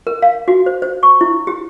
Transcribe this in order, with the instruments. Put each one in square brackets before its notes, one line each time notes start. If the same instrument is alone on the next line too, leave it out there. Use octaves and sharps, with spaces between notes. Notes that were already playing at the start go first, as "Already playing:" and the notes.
[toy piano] A#4
F5
F#4
C5
C5
C#6
E4
G4